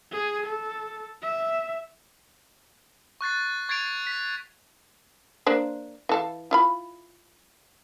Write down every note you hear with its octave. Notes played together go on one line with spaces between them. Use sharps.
G#4
A4
E5
C#6 F#6 A6 C7
C#6 G#6 A6 C7 D7 F7
B6
A#3 D4 C5
E3 A4 F5
E4 F4 B5